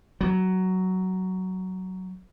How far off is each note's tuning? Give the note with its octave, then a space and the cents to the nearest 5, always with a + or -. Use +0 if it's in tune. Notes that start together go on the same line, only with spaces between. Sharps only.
F#3 +10